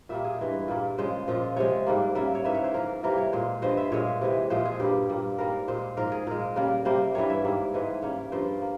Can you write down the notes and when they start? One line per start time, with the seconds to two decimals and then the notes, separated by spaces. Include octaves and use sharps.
0.09 A#2 G3 A#3 E5
0.24 G#4
0.39 G2 E3 G#3
0.68 A#2 G3 A#3
0.98 C#3 F3 G#3 C5
1.28 A#2 F3 G#3
1.56 C3 F3 G#3 C#5
1.87 G#2 G3 A#3
2.15 C#3 G3 A#3 E5
2.35 C#5
2.44 G#2 E3 A#3 E5
2.55 C#5
2.64 C5
2.74 G#2 F3 A#3 A#4
3.03 C3 E3 G3 A#3 A#4
3.18 C#5
3.33 A#2 G#3 C5
3.62 G2 F3 G#3 C5
3.77 E5
3.92 A#2 G#3 C#5
4.21 C3 E3 G#3
4.50 A#2 F3 G#3 C5
4.65 G#4
4.80 G2 G3 A#3 G4
5.09 A#2 G3 A#3
5.38 G#2 G3 A#3 A#4
5.68 A#2 G#3 C5
5.97 G#2 F3 A#3 A#4
6.12 G#4
6.27 A#2 G#3 A#4
6.56 C#3 G3 A#3 A#4
6.85 C3 G3 A#3 C5
7.14 G2 E3 G3 A#3 C#5
7.30 E5
7.44 G#2 G3 A#3
7.74 G#2 E3 G#3
8.02 C#3 G3 A#3 C#5
8.32 G2 F3 A#3 C5
8.62 A#3